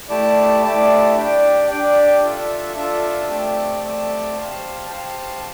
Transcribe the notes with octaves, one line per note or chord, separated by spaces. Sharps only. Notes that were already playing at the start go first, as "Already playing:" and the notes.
A3 E4 G4 D5 A5
A3 E4 G4 D5 A5
D4 G4 D5 G5
D4 G4 D5 G5
D4 F4 A4 E5
D4 F4 A4 E5
A3 C4 G4 D5 A5
A3 C4 G4 D5 A5
G4 C5 F5 A5
G4 C5 F5 A5